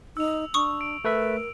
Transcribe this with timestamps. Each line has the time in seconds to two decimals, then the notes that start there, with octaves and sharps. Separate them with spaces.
0.17 D#4 E6 F7
0.54 D4 C#6 D#6
0.81 D7
1.04 A3 A#4 B4 E5